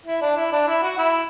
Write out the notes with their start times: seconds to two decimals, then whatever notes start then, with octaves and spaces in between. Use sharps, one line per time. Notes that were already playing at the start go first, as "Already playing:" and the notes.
0.06 E4
0.21 D4
0.37 E4
0.52 D4
0.67 E4
0.82 F#4
0.98 E4